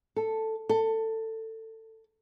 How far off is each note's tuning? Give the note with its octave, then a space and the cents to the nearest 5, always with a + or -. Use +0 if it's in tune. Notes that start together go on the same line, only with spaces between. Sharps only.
A4 +5
A4 +20